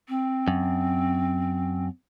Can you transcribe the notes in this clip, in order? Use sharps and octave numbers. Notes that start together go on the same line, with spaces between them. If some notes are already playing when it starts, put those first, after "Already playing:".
C4
F#2